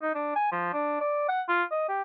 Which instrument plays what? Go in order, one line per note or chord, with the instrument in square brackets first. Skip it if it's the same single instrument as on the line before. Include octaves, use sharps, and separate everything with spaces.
[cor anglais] D#4
D4
G#5
F3
D4
D5
F#5
F4
D#5
G4